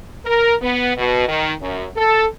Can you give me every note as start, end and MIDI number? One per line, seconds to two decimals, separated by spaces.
0.25 0.53 70
0.61 0.91 59
0.96 1.26 47
1.27 1.52 51
1.61 1.86 42
1.96 2.25 69